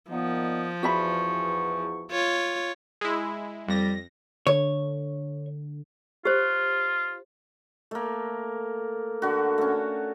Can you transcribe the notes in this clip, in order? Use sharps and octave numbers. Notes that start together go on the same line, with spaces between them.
A#2 D#3 F3 B3
E2 F#4 E5 B5 C#6
F4 C#5
G#3 E4
F2 G3 A#6
D3 C#5
F4 G4 C5
A3 A#3
D3 F#4
A3 C#4